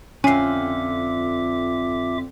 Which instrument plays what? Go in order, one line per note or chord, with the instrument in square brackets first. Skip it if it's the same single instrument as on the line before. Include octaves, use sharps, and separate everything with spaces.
[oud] F2 D3 [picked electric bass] C#4 [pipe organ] F4 E5 D6 [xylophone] G#5 C7